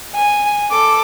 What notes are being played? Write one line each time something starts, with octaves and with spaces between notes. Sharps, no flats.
G#5
A4 D6